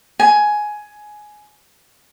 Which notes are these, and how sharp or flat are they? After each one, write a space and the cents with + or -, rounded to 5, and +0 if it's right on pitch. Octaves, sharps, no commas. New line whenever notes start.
G#5 +10